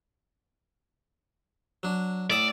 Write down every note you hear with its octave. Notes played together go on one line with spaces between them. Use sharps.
F#3 D4
A2 D5 E5 D#6